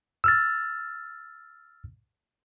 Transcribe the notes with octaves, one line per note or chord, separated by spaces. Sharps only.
E6 F6 A6